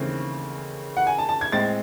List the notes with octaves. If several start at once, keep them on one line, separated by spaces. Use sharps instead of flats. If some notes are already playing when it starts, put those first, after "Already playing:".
Already playing: D#2 C#3 E3 A3 C4
F#5
G#5
A5
A5
G#6
A2 G#3 C4 A6